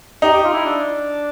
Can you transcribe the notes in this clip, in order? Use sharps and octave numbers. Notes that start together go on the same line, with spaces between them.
D#4 G4
G4
F4
E4
D4